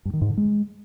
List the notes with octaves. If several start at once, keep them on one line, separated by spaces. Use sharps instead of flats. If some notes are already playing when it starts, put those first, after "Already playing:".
G2
D#3
G#2
D3
G#3